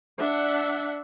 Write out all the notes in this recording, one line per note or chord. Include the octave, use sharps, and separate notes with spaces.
D4 E5 F#5